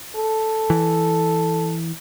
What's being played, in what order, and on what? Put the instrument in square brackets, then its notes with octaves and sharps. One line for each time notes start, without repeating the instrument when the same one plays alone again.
[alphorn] A4
[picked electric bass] E3